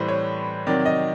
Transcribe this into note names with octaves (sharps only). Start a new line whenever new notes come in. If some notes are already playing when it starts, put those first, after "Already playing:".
Already playing: A2 E3 G3 B4 C5
C#5
C3 D#3 F#3 D5
D#5